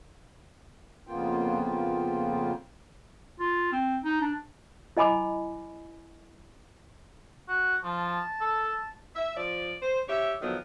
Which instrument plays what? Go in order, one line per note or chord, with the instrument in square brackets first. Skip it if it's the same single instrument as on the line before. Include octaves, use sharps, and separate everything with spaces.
[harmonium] F2 C#3 A#3 B3 F4 G5
[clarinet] F4
C4
D#4
D4
[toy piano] E4 D#5 G#5 B5 D6
[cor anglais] F#4
[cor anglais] F3 [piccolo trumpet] A5
[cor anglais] A4
[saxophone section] E5
F3 D5
C5
C3 G4 C#5 E5
D3 D#3 F3 F#3 B3